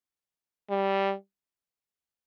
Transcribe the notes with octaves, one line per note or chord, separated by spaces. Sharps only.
G3